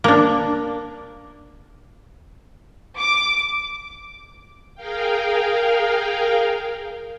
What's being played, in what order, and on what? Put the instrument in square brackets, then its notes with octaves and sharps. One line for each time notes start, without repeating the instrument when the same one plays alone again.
[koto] A#3 D4
[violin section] D6
[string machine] G#4 A#4 F5 G5